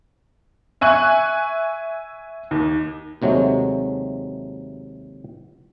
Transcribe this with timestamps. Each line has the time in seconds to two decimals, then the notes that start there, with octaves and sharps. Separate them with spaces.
0.81 E5 G#5 C#6 F#6
2.51 D#2
3.22 D#2 C3 F#3 G#3 A3